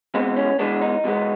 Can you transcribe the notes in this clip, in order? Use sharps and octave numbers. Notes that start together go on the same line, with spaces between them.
E2 B2 G#3 B3 C4
C#4
E2 B2 G#3 B3 D4
D#4
E2 B2 G#3 B3